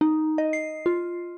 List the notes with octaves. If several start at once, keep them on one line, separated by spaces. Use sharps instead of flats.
D#4
D#5
C7
F4